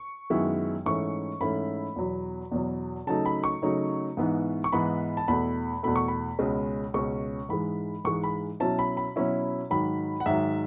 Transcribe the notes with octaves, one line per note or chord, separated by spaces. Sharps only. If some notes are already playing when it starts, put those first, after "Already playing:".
Already playing: C#6
F#2 D#3 G#3 B3 E4
G#2 E3 A3 C#4 E4 C#6
G#2 E3 A3 C#4 E4 B5
E2 B2 F#3
E2 B2 F#3
C#3 F#3 A3 D#4 A5
B5
C#6
C#3 F#3 A3 D#4
G#2 E3 B3 D#4
C#6
G#2 E3 B3 D#4 B5
A5
E2 B2 A3 B5
E2 B2 A3 B5
C#6
B5
C#2 B2 G#3 C#4
C#2 B2 G#3 C#4 C#6
G#2 E3 G#3 B5
G#2 E3 G#3 C#6
B5
B2 F#3 C#4 E4 A5
B5
B5
B2 F#3 C#4 E4
G#2 D#3 F#3 B5
F#5
G#2 D#3 F#3 E5